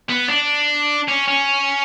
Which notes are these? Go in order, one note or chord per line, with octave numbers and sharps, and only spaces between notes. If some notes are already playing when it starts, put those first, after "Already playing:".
B3
D4
C#4
C#4